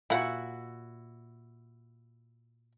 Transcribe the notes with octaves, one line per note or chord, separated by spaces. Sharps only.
A#2 E4 F#4 F#5